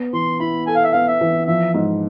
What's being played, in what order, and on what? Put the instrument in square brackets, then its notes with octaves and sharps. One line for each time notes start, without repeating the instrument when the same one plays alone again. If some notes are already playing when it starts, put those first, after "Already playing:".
Already playing: [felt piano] B3
[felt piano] E3 [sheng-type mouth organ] C6
[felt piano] E4 [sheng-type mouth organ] B5
[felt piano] A4 [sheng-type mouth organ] G#5
[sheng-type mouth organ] F5
E5
[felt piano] B3 [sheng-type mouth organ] F5
[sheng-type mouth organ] E5
[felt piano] E3
[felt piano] F3 [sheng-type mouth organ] E5
[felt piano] G#2